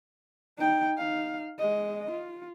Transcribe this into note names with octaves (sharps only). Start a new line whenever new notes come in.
D#4 G5
D#4 F5
G#3 D#5
F4